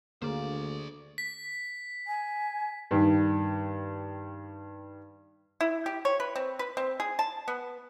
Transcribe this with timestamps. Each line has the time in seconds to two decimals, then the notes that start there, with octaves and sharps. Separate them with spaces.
0.22 D2 D3 A#3 G#4 C5 D5
1.18 B6
2.07 G#5
2.91 G2 D#3
5.61 E4
5.86 G4
6.05 C#5
6.20 B4
6.36 C4
6.59 B4
6.77 C4
7.00 G#4
7.19 A5
7.48 B3